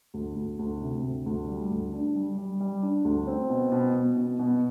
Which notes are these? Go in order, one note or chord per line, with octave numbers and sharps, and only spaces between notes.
D2
D2
D2
C3
D2
D2
G3
D2
D4
G3
G3
G3
D4
D2
C4
B2
B2
B2
B2
B2